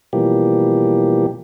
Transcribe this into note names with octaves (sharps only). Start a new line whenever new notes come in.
B2 E3 F3 G3 A#3 G4